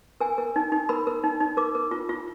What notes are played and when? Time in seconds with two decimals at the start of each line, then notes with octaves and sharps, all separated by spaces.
0.21 A#4 G#5
0.38 A#4
0.56 D#4
0.72 D#4
0.89 A#4 B5
1.07 A#4
1.24 D#4
1.40 D#4
1.57 A#4 D6
1.75 A#4
1.91 F4
2.09 F4